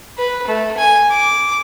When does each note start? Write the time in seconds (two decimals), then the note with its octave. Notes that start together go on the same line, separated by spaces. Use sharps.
0.18 B4
0.47 A3
0.77 G#5
1.10 D6